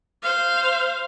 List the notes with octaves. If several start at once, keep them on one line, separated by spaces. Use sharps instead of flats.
C5 F5